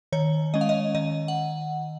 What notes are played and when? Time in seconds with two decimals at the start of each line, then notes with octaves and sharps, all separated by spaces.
0.12 D#3 C#5
0.54 G#3 C#4 D#5
0.61 F5
0.69 D#5
0.95 D#3 D#5
1.28 F#5